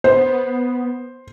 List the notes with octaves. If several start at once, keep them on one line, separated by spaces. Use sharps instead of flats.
B3 C5